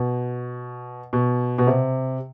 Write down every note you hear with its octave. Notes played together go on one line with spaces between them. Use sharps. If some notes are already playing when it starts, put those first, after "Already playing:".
Already playing: B2
B2
B2
C3